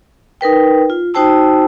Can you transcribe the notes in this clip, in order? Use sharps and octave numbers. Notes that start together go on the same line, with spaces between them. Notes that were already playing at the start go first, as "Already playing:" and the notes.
D#4 A#4 B4 G5
F4
D#4 F#4 C5 G5 A5 E6